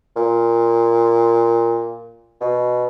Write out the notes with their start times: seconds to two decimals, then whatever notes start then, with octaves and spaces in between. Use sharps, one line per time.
0.16 A#2
2.41 B2